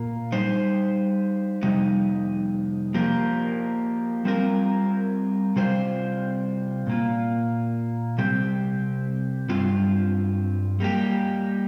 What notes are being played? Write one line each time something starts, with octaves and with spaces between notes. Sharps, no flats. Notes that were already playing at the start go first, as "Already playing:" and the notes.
Already playing: A#2 A#3 F4 A#4
G3 D#4 C5
F2 C3 G3 D#4
F3 A#3 G4 A#4
G3 C4 F4 A#4
C3 G3 C4 F4 C5
A#2 A#3 F4
C3 G3 C4 G4
G2 G3 C4 F4
G3 A#3 G4